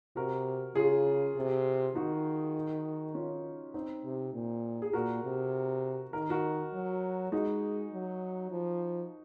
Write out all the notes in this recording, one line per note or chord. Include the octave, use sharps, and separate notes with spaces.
C3 F#4 A#4
C#3 F4 G#4
C3
D#3 D#4 F#4
C#4 F4
C4 D#4
C3
A#2
G#4
A#2 F#4 A#4
C3
D#3 A#4
F#4 A#4
F#3
G#3 D#4 F#4
F#3
F3